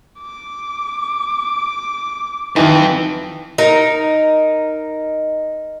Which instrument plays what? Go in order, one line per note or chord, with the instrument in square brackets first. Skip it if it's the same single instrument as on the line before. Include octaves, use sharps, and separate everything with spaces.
[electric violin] D6
[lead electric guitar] F2 [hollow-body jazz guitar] D#3 F#3 D#4 [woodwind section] E3
[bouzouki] D#4 A#4